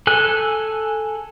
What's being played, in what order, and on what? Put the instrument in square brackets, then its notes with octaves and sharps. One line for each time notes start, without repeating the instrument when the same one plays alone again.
[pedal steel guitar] A4 G#5 F#6